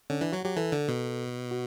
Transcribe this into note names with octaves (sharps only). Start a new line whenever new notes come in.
D3 C#4
E3 D4
F#3 F#4
F#3 G4
E3 A4
D3
B2
F#4